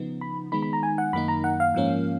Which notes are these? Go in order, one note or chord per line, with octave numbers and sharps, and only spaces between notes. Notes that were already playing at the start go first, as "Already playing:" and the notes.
Already playing: C#3 F3 B3 D#4
B5
D#3 G#3 B3 D#4 B5
B5
A#5
G#5
F#5
F#2 D#3 A#3 D#4 B5
A#5
F#5
F5
G#2 F3 A#3 C#4